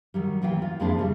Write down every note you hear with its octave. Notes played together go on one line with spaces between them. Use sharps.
D#3 F#3 G3
D#2 E3 B3 F5 G5
F4
F2 G#3 A#3 C4 D4 E4
C#3 G3